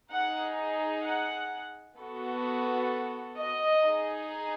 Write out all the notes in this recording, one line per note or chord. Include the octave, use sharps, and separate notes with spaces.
D#4 G#4 F#5
F#5
B3 F#4 A4
D#5
D#4 G#4